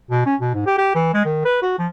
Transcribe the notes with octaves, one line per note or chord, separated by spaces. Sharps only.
B2
C#4
B2
G#2
G4
G4
E3
G#3
D#3
B4
F#4
F3